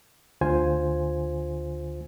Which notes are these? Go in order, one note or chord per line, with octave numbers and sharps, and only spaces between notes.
D2 D3 F4 C5 G#5